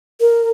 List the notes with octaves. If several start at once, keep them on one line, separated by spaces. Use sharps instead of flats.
A#4